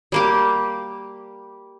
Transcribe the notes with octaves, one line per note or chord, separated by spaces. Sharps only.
G3 A#3 G4